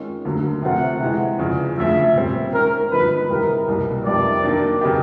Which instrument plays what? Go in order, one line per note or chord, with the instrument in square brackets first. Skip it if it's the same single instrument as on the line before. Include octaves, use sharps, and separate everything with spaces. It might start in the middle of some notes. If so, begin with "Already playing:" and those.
Already playing: [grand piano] D#3 G#3 C#4 F4
D2 D3 F#3 A#3
[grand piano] C3 F3 A3 C4 F4 [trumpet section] F#5
[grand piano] C3 E3 G#3
E2 C#3 F3
[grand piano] D2 C#3 F3 [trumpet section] E5
[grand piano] A#2 G3 C4
[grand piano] D#3 G#3 C#4 [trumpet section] A#4
[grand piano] G2 D3 F3 A#3 D#4 [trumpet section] B4
[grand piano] E2 C3 D#3 G3 B3 [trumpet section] A#4
[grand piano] C2 B2 G3 A#3
[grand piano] F2 C3 D#3 G3 B3 [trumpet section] D5
[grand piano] D#3 F#3 A#3 D4
C#3 F#3 B3 D#4 G4